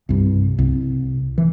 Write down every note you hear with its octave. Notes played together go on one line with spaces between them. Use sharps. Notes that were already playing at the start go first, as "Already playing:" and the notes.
C2 G2
C2
E3